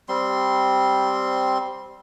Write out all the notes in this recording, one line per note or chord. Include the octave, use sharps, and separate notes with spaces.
G3 C4 C6